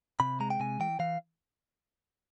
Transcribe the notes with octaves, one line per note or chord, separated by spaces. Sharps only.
C3 B5
G#3 A#5
G5
C3 G#5
E3 G5
E3 F5